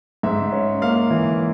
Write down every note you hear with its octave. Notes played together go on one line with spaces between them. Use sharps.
G#2 E5
C#4
A#3 F5
E3